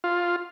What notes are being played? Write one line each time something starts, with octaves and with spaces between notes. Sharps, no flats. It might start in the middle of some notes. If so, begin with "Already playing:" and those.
F4